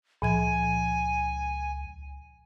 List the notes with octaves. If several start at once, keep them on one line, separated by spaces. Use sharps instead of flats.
C#2 A#2 F3 G#5 G#6